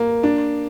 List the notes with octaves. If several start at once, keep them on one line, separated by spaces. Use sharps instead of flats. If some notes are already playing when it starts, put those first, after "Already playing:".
Already playing: A#3
D4